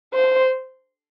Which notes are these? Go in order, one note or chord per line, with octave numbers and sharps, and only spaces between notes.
C5